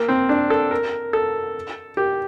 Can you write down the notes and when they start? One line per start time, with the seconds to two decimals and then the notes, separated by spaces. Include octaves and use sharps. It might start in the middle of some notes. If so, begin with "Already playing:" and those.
Already playing: A#3
0.08 C4
0.29 D4
0.50 A4
0.71 A#4
1.13 A4
1.97 G4